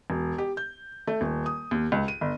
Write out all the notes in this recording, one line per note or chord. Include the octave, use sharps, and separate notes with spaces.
E1
G4
G6
A3
D#1
D#6
D#2
C#2
D#7
G1